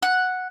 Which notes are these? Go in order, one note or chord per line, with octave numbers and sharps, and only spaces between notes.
F#5